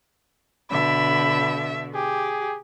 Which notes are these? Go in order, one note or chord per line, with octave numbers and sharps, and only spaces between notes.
B2 D3 E5 B5
G4 G#4